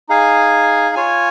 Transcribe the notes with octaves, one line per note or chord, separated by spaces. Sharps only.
D#4 G#4 F5 G#5
F4 C#5 G#5